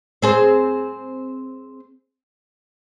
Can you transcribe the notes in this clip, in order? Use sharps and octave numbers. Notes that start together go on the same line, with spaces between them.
C4 G#4 C5